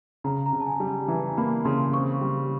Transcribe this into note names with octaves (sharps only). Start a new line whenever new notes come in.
C#3 A#5
A#5
C#3
A5
G#5
G3
A5
E3 A#5
A#3 B5
C#3 C6
C4 C#6
G3